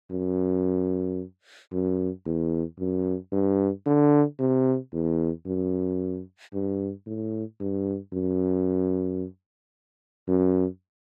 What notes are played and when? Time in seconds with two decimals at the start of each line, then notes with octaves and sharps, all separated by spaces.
0.11 F#2
1.72 F#2
2.26 E2
2.79 F#2
3.32 G2
3.86 D3
4.39 C3
4.93 E2
5.46 F#2
6.54 G2
7.06 A2
7.60 G2
8.13 F#2
10.28 F#2